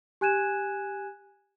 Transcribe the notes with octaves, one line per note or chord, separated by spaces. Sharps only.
G4 G#5 F#6 G#6 D#7 E7